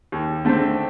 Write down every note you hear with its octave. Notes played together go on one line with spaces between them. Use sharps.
D#2
D3 A3 C4